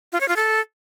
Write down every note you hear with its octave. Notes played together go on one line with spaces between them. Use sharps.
F4
C#5
F4
A4